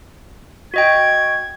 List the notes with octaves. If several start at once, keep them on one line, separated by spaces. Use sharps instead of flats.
F#4 D#5 G5 G#6